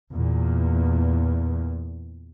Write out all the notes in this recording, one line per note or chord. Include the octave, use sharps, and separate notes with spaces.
E2 A#2